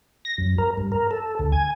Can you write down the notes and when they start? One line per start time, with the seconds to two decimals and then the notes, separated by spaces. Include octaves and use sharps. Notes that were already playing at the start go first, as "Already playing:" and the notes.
0.25 A#6
0.38 F#2
0.58 A#4
0.77 G2
0.92 A#4
1.11 A4
1.39 D2
1.52 G#5